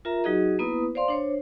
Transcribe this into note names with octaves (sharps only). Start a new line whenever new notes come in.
F4 A#4 E5 A#5
F#3 D#4 F#4 G#4 D#5
A#3 B3 E4 B4 D#6
C5 D5 F5 C6
D4 C5 C#5